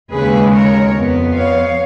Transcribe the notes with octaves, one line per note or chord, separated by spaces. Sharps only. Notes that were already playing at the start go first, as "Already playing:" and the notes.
D#2 C#3 G#3 G#4 B4
A#4 C#5
F2 F3 B3
C#5 F5